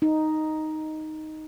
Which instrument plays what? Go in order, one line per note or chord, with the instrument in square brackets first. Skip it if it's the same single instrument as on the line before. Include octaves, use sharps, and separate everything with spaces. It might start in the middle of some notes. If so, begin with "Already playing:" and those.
[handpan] D#4